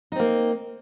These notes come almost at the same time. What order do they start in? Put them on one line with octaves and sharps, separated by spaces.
D#4 C4 A#3